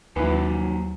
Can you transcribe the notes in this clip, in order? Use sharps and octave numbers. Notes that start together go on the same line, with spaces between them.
D#2 F3 F#3 A#3 D#4 E4 B4 G#5